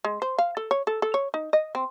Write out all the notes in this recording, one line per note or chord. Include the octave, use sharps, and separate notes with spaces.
G#3
C5
F5
A4
C#5
A4
A4
C#5
D#4
D#5
C4